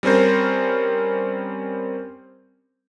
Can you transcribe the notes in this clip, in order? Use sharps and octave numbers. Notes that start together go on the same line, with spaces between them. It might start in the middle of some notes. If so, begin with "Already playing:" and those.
G3 C4 C#4 A#4 C5